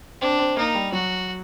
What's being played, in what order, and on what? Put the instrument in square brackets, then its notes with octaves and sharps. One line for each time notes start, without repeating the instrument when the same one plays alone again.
[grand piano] C4 [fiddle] D4
[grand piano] C4
[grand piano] A#3 [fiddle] D#4
[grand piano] G3
[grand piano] F#3 [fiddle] F#4